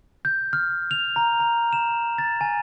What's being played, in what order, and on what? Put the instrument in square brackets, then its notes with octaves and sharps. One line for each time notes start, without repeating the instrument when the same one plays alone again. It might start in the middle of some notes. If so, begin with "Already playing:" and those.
[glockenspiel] G6
F6
F7
A#5
A#5
E7
A6
G#5